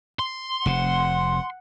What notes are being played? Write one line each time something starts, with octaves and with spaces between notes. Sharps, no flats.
C6
F1 C3 F#5